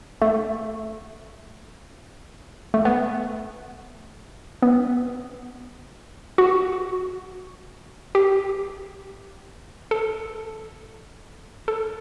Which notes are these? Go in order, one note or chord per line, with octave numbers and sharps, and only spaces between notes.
A3
A3
B3
B3
F#4
G4
A4
A4